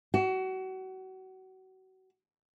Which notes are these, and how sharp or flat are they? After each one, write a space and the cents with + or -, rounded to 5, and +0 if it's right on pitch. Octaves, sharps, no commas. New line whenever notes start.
F#4 +30